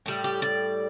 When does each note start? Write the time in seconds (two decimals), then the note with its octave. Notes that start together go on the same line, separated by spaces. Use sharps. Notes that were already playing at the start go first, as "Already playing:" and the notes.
0.06 A2 G3
0.24 G4
0.42 D5